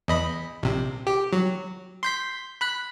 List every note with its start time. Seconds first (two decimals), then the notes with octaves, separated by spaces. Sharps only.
0.08 E2 D#5 B5
0.63 A#1 C3
1.07 G4
1.32 F#3
2.03 C6 G6 B6
2.61 B5 F#6 B6